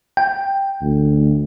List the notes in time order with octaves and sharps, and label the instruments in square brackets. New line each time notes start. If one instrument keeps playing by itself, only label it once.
[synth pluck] G5
[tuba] D2